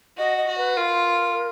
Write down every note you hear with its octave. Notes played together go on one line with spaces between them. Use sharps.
F#4 D#5
D#5
F#4
B4
F4 A#4